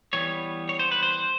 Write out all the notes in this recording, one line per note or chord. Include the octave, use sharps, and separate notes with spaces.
E3 G3 B3 C#5
C#5
C5
B4
C5